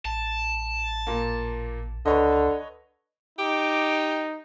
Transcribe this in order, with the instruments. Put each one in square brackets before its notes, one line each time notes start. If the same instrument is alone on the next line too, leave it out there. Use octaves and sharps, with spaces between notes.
[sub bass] A1 [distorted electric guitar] A5
[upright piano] A#2 A#3
[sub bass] C#2 [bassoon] D3 [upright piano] B4 C#5 D#5
[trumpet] D#4 [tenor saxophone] G4 [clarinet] D6